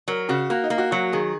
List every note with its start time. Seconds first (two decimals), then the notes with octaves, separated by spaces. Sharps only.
0.08 F#3 A#4
0.29 C#3 F#4
0.50 A#3 F#4
0.64 D#4
0.70 A#3
0.78 F#4
0.91 F#3 F#4
1.12 D#3 G#4